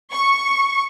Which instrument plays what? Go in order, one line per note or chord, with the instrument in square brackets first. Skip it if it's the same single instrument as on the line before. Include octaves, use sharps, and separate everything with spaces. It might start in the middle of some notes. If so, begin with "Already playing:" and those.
[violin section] C#6